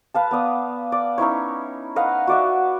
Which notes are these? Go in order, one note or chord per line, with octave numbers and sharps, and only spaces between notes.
B4 F5 A5
B3 D5 D#6
D5
C#4 D#4 E4 C#5
B4 D#5 F5 F#5
F#4 D5 E5